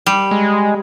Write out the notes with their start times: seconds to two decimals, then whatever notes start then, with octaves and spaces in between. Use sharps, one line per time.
0.06 G3
0.31 G#3